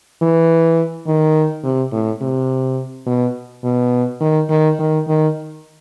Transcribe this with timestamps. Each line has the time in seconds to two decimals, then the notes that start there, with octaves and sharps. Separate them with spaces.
0.22 E3
1.07 D#3
1.64 C3
1.92 A2
2.21 C3
3.07 B2
3.64 B2
4.21 D#3
4.50 D#3
4.79 D#3
5.07 D#3